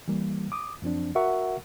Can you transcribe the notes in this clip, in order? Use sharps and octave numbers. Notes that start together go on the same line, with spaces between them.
E3 G3 A#3
D6 D#6
F#2 F3 C4 D4
F#4 A#4 E5 F#5 C#6